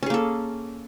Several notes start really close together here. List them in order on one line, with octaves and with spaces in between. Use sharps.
C#4 G#4 A#3 A4